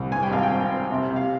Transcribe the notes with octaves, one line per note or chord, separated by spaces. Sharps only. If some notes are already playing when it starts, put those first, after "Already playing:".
Already playing: C2
G2 G#5
G5
G#1 F5
G5
C4
C4
C3
C3
F5